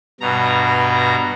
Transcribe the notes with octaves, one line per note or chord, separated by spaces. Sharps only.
G2 B2 A#5